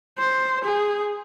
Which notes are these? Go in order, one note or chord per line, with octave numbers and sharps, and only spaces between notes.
C5
G#4